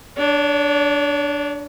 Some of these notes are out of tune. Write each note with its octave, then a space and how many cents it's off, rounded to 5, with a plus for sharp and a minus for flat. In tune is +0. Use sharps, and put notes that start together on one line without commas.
D4 +0 C#5 +40